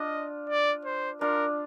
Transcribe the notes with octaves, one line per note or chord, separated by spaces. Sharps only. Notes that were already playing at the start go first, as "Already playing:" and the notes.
Already playing: D4 F4 D#5
D5
C5
D4 F4 A#4